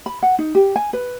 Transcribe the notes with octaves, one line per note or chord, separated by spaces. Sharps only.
B5
F#5
D#4
G4
G#5
B4